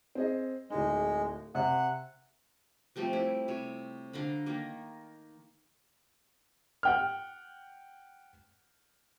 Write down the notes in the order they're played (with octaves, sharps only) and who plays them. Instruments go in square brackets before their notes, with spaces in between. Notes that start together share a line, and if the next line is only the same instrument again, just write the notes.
[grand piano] C4 G#4 D#5
[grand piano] D1 D#4 [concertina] G#3
[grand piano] C3 [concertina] F#5
[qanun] F3 G3 A3 C4
E4 G4
C3 C#5
D3 F5 A#5 B5
D#3 A#3 D#4
[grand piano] F#5 G5 F6